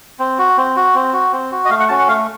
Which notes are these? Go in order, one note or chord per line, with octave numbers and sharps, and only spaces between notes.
C4
F#4
C4
F#4
C4
F#4
C4
F#4
D#5
A3 F5
F#5
C#4 F#4 A5
F#5
A3 F5